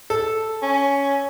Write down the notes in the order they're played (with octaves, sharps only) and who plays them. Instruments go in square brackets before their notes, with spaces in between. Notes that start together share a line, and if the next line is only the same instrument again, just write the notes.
[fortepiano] A4
[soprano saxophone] C#4